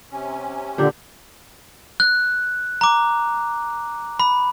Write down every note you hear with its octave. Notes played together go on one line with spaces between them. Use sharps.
C3 C#4
A#2 D3 D4 G4
F#6
A#5 D6
B5